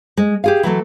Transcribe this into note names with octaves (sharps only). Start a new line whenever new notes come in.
G#3
G4 G#4 F5
E3 F#3 A3